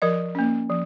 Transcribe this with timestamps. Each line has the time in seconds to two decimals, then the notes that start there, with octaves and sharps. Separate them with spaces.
0.02 F3 A#4 D#5
0.35 A#3 C#4
0.70 F3